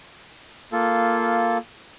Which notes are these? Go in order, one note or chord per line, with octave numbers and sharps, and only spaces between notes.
A#3 F4 A4